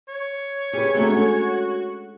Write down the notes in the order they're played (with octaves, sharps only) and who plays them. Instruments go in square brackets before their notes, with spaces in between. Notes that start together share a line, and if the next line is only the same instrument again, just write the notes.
[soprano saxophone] C#5
[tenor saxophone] C#4 [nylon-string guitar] G4 B4 [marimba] G#4
[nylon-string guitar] E2 A3 C4 [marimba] G#3 D4 A#5 [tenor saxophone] F#4
[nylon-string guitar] C#4 [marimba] A4 F#5 G#5